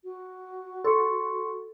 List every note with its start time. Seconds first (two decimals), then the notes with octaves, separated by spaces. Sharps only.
0.04 F#4
0.84 A4 C6 C#6 C#7